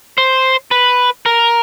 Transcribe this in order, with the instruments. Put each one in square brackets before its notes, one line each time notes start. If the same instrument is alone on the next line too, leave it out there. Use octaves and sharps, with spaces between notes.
[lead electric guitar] C5
B4
A#4